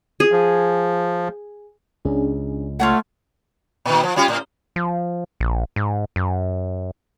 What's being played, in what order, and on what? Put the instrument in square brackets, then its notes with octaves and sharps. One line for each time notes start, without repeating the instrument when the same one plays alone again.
[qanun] G#4
[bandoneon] F3
[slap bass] C#2 [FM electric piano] C#4 D4 G#4
[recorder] A3 [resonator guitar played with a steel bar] F4 C#5 F#5
[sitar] A#2 D#3
F3
G3 C#4 F4
A2
[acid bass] F3
A#1
G#2
F#2